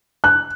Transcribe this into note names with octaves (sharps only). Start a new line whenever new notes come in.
F#6